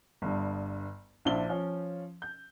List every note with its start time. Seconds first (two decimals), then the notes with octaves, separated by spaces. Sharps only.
0.22 G1 G2
1.25 A#1 D4 E4 C5 G7
1.49 F3 C#4
2.22 G6